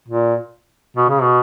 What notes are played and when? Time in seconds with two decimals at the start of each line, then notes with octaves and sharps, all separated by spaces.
0.08 A#2
0.97 B2
1.09 C#3
1.22 B2